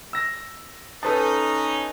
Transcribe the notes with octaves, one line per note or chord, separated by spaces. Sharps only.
E6 A#6
C#4 D#4 A4 B4 A5